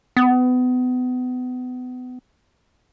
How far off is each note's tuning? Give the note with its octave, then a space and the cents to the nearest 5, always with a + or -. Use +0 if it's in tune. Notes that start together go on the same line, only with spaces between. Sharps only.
B3 +30